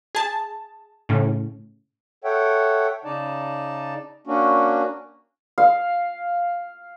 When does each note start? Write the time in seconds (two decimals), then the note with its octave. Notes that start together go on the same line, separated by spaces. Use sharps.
0.15 G#4 A5
1.09 A2 C#3
2.24 A4 C#5 E5 F#5 G5
3.05 C#3 D#4 D5 A5
4.27 A#3 C#4 D4 F#4
5.58 F5